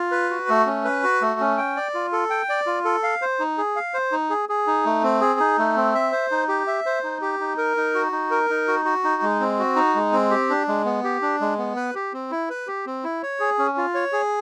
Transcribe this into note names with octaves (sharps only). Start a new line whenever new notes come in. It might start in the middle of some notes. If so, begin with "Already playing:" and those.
Already playing: F4
B4
F#4
A3
C#4
B4
F#4
A3
C#4
G5
D5
F4
A4
G5
D5
F4
A4
F5
C5
D#4
G#4
F5
C5
D#4
G#4
G#4
D#4
A3
C4
G#4
D#4
A3
C4
E5
C5
D#4
G4
E5
C5
D#4
G4
D#4
A#4
D#4
F#4
D#4
A#4
D#4
F#4
F#4
D#4
G#3
C4
F#4
D#4
G#3
C4
G4
D4
G#3
B3
G4
D4
G#3
B3
B4
G4
C4
E4
B4
G4
C4
E4
C#5
G#4
C#4
F4
C#5
G#4